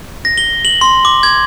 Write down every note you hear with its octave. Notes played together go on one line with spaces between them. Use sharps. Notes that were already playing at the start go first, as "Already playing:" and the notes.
A#6
G7
F#7
C6
D6
G#6